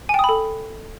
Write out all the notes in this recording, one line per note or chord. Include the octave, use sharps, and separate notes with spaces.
A4 G5 G#5 B5 D#6